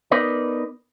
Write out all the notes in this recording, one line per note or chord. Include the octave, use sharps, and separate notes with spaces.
B3 D#4 A#4 B4 D5